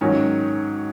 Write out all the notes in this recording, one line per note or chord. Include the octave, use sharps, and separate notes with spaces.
G#2 D#3 F#3 C#4